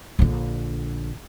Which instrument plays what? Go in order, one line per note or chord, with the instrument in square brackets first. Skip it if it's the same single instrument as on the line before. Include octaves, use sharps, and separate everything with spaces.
[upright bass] A#1 D3